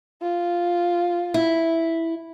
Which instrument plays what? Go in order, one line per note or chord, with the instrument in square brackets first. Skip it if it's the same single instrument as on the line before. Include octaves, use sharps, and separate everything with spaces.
[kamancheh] F4
[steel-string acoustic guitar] E4